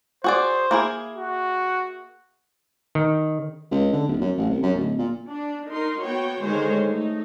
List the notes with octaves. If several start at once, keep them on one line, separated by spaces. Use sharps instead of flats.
F#4 G#4 C5 D5
A#3 E4 G#4
F#4
D#3
C#2
D3
D#1
F#2
A1
C2
F#2
D1
A#2
D4
D#4 A#4 C6
A#3 B3 F#4 C#5 G5
D3 D#3 G#3 C5 C#5
A3 D#4